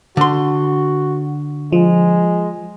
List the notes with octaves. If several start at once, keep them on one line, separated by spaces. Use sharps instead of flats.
D3 F#4 C6
F3 G#3